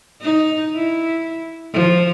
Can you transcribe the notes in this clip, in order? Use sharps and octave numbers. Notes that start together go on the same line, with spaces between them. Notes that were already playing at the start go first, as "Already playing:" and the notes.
D#4
E4
F3